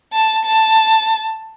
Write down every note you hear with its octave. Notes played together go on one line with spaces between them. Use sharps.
A5
A5